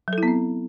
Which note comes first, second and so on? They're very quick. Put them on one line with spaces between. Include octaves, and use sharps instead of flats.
F#3 A4 E4 B3 C4